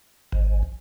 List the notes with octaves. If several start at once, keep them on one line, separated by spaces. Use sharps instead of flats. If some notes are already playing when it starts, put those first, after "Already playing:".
G#1